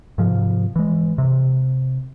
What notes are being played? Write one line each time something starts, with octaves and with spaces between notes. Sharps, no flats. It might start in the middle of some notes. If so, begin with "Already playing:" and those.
G#2 C3 F3
E3 G#3
C3